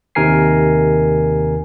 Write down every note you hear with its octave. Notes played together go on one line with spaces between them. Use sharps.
D#2 C3 D#3 A#4 G#5 C7